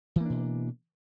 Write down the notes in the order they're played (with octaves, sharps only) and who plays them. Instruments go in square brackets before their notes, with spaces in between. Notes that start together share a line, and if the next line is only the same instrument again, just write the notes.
[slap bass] E3
A#3
D4
B2